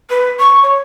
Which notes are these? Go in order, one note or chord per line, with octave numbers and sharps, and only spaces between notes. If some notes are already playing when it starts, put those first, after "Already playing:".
B4
C#6
C#5